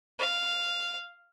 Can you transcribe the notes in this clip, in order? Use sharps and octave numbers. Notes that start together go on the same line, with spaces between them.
F5